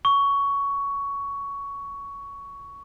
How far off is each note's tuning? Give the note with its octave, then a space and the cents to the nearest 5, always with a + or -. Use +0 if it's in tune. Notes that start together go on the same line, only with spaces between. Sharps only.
C#6 +15